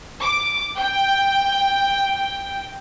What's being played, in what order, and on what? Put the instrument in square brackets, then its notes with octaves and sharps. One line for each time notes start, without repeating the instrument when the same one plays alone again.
[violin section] D6
G5